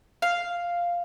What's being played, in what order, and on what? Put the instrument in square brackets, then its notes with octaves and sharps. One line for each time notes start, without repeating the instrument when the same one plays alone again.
[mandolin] F5